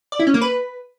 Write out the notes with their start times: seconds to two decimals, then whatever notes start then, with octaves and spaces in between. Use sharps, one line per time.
0.12 D5
0.19 E4
0.27 C#4
0.34 A#3
0.41 B4